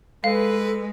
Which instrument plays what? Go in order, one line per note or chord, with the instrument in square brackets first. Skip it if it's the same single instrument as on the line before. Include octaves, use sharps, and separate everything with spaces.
[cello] G#3 [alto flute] A4 [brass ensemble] B4 [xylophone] F5